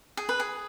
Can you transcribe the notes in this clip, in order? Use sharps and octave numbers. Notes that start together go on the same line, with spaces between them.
G#4
B4
G#4